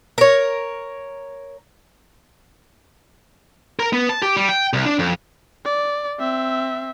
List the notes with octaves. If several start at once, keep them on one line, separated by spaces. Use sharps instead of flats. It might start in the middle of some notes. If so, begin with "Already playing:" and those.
A#4 C#5
A#4
B3
A5
G4
G3
G5
C2
D4
F2
D5
C4 E5